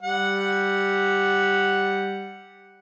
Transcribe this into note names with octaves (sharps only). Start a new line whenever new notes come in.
G3 F#5